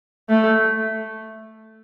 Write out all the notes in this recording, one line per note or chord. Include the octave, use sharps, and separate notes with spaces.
A3